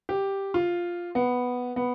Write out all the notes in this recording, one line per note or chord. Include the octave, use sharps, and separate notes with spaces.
G4
F4
B3
B3